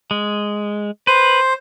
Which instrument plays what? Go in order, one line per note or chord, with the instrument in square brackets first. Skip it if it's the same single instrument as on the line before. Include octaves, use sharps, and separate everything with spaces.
[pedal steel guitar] G#3
[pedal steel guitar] B4 [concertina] C5